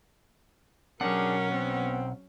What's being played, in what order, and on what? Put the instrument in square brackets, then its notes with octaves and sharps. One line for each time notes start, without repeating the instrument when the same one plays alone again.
[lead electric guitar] B1 F#5 [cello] F#3 C#4 [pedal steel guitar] D4 G4 G#4 [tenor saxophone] A#4
[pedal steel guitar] B3 [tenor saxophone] C4